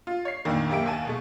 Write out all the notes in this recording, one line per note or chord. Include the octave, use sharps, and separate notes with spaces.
F4
C#5 C7
F2 A#2 D3 D#3 A3
F#2 A#3 G4 E5 D7
D#2 G#5 A5
B2 G#3 A3